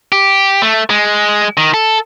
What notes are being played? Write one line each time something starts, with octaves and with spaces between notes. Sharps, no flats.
G4
A3
G#3
D#3
A4